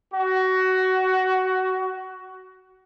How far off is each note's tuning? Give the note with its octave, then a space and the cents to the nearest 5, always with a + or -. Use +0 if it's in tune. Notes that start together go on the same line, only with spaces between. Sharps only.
F#4 +20